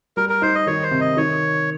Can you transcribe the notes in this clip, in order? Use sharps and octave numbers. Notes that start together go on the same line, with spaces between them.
G3 A#4
A#4
D#4 C5
D#5
D#3 C#5
C5
C3
D#5
D#3 C#5